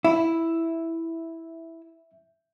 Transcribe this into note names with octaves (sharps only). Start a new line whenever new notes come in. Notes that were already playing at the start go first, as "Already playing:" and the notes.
E4 E5